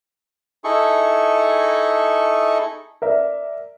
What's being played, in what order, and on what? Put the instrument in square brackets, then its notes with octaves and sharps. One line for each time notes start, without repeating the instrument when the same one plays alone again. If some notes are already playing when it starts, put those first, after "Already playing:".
[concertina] D#4 E4 G#4 A4 C#6
[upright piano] A#4 D5 E5